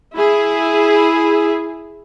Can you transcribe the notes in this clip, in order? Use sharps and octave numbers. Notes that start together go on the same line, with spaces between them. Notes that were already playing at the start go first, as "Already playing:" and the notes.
E4 G#4